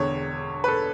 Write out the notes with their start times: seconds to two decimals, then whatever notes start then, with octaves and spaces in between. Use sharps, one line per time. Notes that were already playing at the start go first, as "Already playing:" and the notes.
Already playing: E1 E2 D3 C#5
0.64 B4
0.68 A4